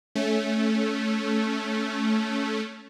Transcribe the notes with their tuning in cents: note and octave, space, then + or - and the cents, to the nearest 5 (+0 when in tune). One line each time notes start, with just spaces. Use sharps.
A3 -10 C#4 +0